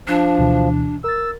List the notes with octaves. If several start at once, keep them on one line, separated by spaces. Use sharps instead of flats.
F3 D4
D2 B2 E3
A#4 E6 A6